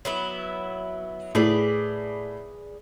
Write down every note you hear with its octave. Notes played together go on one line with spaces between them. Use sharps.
F#3 B3 E4
A2 G#4 B4 D5